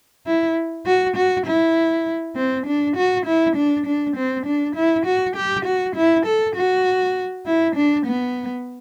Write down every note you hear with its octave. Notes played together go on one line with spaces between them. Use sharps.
E4
F#4
F#4
E4
C4
D4
F#4
E4
D4
D4
C4
D4
E4
F#4
G4
F#4
E4
A4
F#4
E4
D4
B3